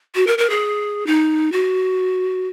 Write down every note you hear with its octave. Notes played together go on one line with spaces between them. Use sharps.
F#4
A#4
A#4
G#4
D#4
F#4